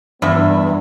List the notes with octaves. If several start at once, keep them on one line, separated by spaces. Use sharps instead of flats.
E2 G2 B3 D4 E4 F#4 E5